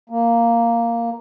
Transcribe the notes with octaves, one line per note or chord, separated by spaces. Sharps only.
A#3